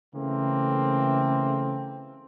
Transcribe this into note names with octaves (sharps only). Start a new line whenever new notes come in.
C#3 E3 A3 A#3 C4